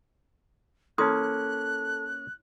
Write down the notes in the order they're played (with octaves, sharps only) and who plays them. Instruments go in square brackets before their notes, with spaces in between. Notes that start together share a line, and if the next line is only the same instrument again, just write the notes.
[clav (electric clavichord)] A#3 C#4 [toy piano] E4 C6 D#6 [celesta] A4 A5 [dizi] F#6